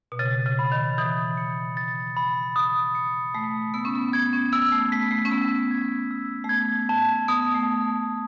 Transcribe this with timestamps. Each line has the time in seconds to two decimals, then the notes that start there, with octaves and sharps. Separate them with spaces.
0.12 B2
0.19 C#3 A6
0.46 C#3
0.59 B5
0.72 D#3
0.98 E3 D#6
1.37 C#7
1.77 A6
2.17 B5
2.56 D#6
2.95 C#7
3.34 A3 B6
3.74 B3 E6
3.85 C#4
3.95 B3
4.13 B3 G#6
4.33 C#4
4.52 B3 E6
4.72 A3
4.92 A3 B6
5.02 B3
5.11 A3
5.25 C#4
5.31 B3 E6
5.71 G#6
6.11 E6
6.44 A3
6.49 B3 G#6
6.89 A5
7.28 B3 D#6
7.54 A3